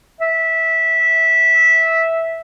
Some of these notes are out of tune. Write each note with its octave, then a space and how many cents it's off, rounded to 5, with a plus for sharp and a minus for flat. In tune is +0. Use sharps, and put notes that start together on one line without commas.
E5 -15